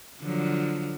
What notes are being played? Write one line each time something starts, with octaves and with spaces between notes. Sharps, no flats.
D3 F3 F#3